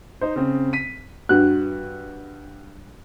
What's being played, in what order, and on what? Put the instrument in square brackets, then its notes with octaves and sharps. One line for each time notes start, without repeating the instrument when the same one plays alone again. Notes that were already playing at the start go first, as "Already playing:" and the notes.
[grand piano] D#4 C5
C#3 C4
B6 D#7
[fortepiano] G2 F#4 F#6